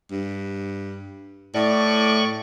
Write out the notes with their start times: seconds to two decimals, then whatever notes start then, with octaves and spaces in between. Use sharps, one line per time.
0.11 G2
1.54 A2 D5 C#6